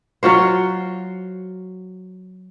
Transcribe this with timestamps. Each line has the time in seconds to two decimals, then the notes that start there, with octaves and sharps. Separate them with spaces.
0.23 F#3 F4 F#4 C5